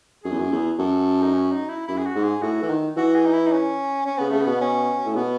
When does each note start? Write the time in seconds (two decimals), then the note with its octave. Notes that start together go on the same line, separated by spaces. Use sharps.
0.24 F#2 G#4
0.31 E2
0.39 F#2
0.52 E2
0.79 F#2 A4
1.22 D#4
1.34 C#4
1.52 D#4
1.69 E4
1.88 F#2 E4
1.98 G#4
2.06 F#4
2.15 G#2
2.24 G#4
2.42 A2 F#4
2.62 E3
2.69 D#3
2.97 E3 F#4
3.15 G#4
3.26 D#4
3.34 E4
3.47 D#4
3.52 C#4
4.07 C#4
4.18 C#3 B3
4.30 C#3 A3
4.42 B2 B3
4.61 C#4
5.06 A2
5.15 B2 B3